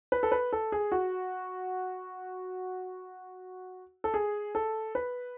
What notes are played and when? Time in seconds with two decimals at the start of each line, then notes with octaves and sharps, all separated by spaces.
0.12 B4
0.23 A4
0.32 B4
0.53 A4
0.72 G#4
0.92 F#4
4.04 A4
4.14 G#4
4.55 A4
4.95 B4